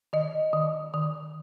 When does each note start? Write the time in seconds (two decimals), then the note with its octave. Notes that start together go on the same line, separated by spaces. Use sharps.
0.13 D#3 D#5
0.53 D#3
0.94 D#3